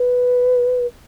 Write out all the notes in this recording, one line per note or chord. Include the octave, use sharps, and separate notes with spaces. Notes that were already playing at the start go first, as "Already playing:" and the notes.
Already playing: B4